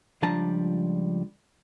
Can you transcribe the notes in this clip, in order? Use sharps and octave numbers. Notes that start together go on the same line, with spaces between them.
C#2 F3 G3 D4 A5 A#5